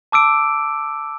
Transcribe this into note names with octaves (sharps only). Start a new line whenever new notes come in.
A5 D6 E6 D7